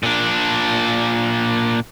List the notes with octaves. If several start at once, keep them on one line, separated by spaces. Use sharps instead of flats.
A#2 D4